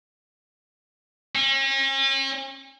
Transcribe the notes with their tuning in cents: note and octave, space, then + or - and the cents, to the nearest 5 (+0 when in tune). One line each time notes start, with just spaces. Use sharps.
C#4 -40